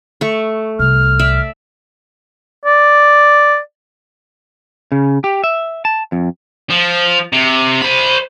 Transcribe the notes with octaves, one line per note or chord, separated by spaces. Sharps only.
A3 C#6
C2 F6
D5 E5
D5
C#3
G4
E5
A5
F2
F3
C3
C5 B5